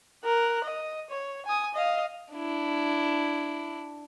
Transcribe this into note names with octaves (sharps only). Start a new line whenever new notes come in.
A#4 F#6
D#5
C#5
G#5 D#6
D#5 F5
D4 E4